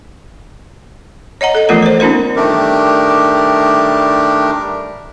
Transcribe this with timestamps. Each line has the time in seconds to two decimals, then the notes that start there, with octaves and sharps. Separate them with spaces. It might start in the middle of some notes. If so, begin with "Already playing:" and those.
1.41 C#5 D#5 F#5 A#5
1.55 A4 D#5
1.69 E3 F3 A3 B3 F4 A#4
1.83 A#4 C5
2.00 B3 C#4 D#4 F4 A#4
2.36 D#3 G3 A3 D4 G4 A#4